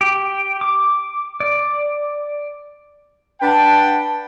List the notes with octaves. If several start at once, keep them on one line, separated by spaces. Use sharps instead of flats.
G4
D6
D5
D4 B4 F#5 G5 A5